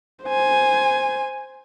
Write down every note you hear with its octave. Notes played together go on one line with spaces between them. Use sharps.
C5 G#5